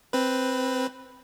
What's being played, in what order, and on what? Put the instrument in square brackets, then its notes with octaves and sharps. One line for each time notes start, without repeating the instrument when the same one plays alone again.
[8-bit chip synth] C4 B4